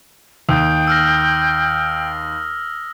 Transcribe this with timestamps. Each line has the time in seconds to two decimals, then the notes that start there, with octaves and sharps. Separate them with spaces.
0.49 D#2 G5 D#6
0.87 E6 F6 A#6